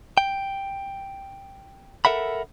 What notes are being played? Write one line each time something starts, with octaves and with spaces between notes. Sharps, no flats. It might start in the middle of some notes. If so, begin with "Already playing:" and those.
G5
A4 A#4 E5 F#5 B5